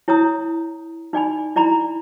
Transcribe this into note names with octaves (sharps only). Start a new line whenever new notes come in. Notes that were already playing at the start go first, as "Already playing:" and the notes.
E4 C#5 A#5 D#6
D#4 D5 G#5 B5
E4 D5 A#5 B5